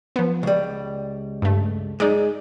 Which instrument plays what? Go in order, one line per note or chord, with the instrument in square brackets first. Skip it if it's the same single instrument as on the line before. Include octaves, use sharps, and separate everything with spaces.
[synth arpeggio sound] F3 B3
[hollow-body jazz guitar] C#2 G3
[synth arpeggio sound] G2 A3
[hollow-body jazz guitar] G#3 [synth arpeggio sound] D#4 D5